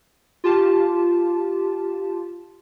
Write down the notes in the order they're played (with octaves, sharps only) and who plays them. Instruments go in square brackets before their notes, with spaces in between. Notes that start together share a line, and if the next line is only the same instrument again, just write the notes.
[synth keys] F4 G4 A5